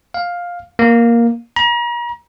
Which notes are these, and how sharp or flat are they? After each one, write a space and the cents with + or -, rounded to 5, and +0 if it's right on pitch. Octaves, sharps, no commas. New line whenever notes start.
F5 +10
A#3 +5
A#5 +40